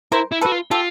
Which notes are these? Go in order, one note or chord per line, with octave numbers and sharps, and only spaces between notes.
E4 A#4 C5
E4
A4 B4
F#4
F4
F4 G4 A4